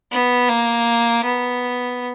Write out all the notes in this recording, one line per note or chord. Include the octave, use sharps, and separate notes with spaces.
B3
A#3
B3